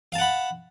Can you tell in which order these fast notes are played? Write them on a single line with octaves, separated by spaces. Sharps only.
F5 A5 F#5 B5